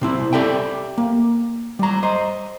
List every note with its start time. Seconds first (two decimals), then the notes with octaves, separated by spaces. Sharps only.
0.01 C3 C4 E4
0.33 G4 A4 D5 E5 G5
0.98 A#3
1.79 G3 A#5
2.03 C5 D#5